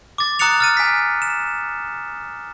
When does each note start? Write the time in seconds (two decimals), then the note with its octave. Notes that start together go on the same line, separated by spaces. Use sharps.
0.18 D6 A6
0.39 A#5 D#6 F#6 A6 C#7 F7
0.60 F6 A6 D#7
0.77 G#5 B6
1.22 E7